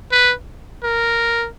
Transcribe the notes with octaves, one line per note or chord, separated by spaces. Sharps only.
B4
A#4